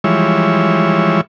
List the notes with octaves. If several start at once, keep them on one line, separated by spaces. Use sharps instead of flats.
E3 F3 G3 G#3 C#5 E5